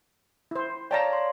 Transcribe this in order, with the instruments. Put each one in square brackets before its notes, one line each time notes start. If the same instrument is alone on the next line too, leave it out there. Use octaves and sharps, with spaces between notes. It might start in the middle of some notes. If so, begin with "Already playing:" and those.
[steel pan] E4 C5
[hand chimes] C#5 D5 F5 [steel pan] G5 A5 A#5
[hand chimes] C6